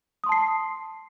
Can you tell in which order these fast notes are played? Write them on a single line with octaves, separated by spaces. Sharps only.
D#6 C6 A5 C7